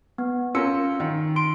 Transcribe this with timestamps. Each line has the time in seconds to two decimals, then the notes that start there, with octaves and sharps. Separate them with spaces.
0.18 B3
0.55 C#4 F4 A#4 E6 C#7
1.00 D#3
1.36 C6 D7